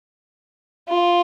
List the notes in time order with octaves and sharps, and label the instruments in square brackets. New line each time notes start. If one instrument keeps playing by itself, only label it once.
[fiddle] F4